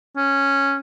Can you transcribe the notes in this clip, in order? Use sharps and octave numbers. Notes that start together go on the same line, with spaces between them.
C#4